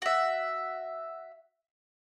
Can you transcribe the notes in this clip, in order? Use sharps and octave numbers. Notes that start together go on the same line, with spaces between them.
F#4 E5